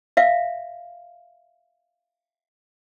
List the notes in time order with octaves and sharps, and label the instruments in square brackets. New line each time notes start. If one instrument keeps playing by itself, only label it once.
[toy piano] E5 F5